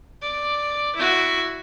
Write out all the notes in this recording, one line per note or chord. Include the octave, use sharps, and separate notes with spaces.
D5
E4 F#4